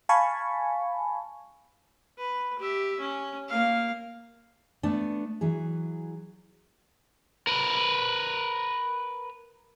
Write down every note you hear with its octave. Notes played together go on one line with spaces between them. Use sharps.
F5 G#5 A5 B5 C#6
B4
G4 E5
C#4
A#3 F5
A3 B3 D4
E3 F#3 G#4
A#4 B4